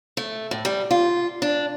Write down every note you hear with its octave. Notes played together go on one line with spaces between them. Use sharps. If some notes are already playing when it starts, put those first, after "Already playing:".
A3
A2
G3
F4
D4